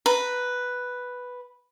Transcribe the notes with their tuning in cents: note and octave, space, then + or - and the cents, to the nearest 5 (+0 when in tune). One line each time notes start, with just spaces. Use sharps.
B4 +0 A#5 +0